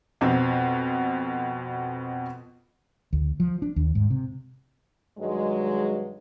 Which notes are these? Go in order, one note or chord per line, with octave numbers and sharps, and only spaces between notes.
F2 B2 C4
D2
F3
D4
D#2
G#2
C3
G2 D#3 F#3 G#3